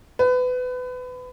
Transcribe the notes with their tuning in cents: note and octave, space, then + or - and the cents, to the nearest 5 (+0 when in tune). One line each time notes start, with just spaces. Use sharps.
B4 +25